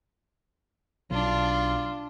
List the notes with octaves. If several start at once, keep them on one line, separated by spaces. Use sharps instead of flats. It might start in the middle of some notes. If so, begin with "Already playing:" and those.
B1 D4 F4